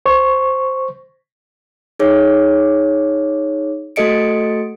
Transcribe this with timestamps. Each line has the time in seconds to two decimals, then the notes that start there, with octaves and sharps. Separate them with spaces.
0.06 C5 C#6
1.99 D#4 G#4 C#5
3.96 A3 F#4 A4 D#5 C#7 D7